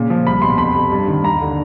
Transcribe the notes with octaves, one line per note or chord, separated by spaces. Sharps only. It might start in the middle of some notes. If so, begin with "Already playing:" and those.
Already playing: A#2 C#3
F3
C2 B5
B2 C6
F2 B5
C3
G2
D#3
D#2 A#5
D3